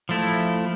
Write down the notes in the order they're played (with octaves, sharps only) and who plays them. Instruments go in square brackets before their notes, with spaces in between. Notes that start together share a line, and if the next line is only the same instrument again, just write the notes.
[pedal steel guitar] F3 A3 E4